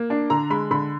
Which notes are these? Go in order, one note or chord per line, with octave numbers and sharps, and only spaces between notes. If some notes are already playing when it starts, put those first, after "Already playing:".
Already playing: A#3
D4
D3 A#5
G#3 B5
D3 B5